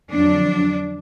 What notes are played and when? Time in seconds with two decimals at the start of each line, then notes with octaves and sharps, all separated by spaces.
0.12 F2 D3 F#3 D4